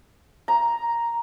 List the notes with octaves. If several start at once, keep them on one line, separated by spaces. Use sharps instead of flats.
A#5